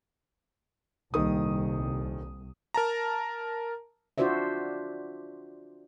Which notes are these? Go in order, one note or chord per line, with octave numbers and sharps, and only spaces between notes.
D#1 C2 D#3 D#6
A#4 A5 A#5
D4 F4 F#4 C5 D5 E5